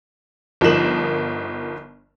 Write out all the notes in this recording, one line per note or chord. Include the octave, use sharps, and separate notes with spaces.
G1 F3 D#4 A#4 E7 F#7